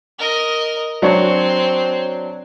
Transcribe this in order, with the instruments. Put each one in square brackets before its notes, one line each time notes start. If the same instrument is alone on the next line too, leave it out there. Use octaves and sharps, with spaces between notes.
[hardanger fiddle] A#4 D#5
[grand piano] F#3 D4 C#5 [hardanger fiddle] C4